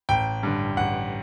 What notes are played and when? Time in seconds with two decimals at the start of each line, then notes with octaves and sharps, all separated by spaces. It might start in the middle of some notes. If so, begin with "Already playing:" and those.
0.09 A1 G5
0.43 G2 D3
0.77 A1 F#5